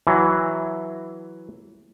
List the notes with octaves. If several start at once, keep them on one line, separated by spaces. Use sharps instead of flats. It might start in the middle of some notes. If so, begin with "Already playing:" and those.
E3 F#3